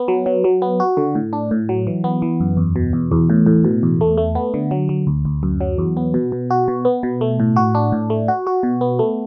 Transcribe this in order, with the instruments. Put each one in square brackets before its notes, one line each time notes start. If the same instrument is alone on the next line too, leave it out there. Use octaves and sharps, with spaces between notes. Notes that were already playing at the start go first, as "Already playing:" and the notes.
Already playing: [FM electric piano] B3
F#3
F#3
F#3
B3
F#4
D3
A2
D4
A2
F#3
E3
B3
E3
F#2
E2
B2
E2
E2
A2
A2
B2
E2
A3
A3
B3
D3
F#3
F#3
D2
D2
F#2
F#3
E2
B3
B2
B2
F#4
B2
B3
B2
A3
A2
F#4
D4
A2
A3
F#4
F#4
B2
B3
A3